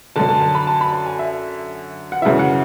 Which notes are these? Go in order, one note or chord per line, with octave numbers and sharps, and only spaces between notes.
F#2 D3 A5
A5
A5
B5
A5
B5
A5
G#5
E5
F#5
F#2 C#3 E3 E5
F#5